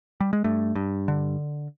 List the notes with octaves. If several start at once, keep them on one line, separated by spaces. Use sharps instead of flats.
G3
G#3
G2 A3
G2
D3